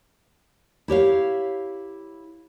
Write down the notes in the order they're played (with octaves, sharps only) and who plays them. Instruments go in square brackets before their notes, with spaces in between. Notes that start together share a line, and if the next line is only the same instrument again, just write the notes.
[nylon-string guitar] E4 G4 C#5 F5